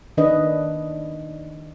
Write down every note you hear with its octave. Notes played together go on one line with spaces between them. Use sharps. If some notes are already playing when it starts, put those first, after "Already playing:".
D#3 D4 B4 D#5